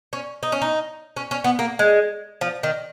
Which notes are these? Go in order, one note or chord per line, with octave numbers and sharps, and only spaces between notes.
C#4
D#4
C#4
D#4
C#4
C#4
B3
A#3
G#3
F3
D#3